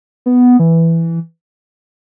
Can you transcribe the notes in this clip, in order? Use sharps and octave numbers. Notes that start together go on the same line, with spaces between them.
B3
E3